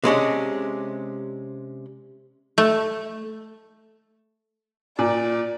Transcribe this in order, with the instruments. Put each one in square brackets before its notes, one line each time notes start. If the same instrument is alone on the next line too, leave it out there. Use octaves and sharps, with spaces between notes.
[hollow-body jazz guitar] C3 G#3 C#4 D4
[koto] A3
[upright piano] A#2 [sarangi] D5